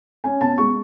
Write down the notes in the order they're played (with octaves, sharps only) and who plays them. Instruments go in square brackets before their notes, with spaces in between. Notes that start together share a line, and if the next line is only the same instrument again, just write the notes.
[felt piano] C#4 G#5
B2 A5
G#3 C#6